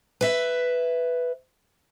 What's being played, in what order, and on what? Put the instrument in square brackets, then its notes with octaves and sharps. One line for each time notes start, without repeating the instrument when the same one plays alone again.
[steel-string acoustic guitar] B4 E5